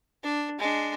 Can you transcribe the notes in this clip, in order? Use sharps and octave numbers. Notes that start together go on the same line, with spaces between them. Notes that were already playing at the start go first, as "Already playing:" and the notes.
D4
G#3 D4